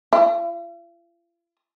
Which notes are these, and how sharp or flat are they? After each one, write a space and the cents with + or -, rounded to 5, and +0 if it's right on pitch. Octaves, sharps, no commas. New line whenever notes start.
F4 -45